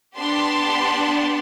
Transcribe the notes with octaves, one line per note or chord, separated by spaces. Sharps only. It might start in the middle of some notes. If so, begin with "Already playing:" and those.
B3 D4 G4 A5 C6